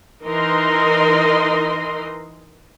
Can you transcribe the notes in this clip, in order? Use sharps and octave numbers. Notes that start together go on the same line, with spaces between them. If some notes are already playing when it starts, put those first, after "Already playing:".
E3 D#4 A#4 D#5 C6